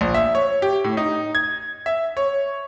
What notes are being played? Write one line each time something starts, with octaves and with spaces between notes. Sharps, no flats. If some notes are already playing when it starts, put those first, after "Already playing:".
A#1
E5
C#5
G4
A2
D#4
G#6
E5
C#5